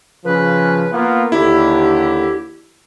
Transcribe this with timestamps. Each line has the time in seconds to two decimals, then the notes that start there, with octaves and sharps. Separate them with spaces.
0.25 C#3 F3 B4
0.91 A#3 B3 F4
1.32 D#2 D3 E4 G4